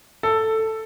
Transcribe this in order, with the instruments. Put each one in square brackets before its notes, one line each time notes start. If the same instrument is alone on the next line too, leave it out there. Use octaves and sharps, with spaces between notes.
[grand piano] A4